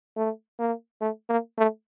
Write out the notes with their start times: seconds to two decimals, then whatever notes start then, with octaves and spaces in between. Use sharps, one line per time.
0.17 A3
0.59 A#3
1.01 A3
1.30 A#3
1.58 A3